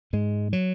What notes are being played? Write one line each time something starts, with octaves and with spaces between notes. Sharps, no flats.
G#2 G#3
F#3